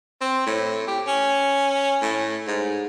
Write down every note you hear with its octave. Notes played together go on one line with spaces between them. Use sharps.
C4
A2
G4
C#4
A2
G#2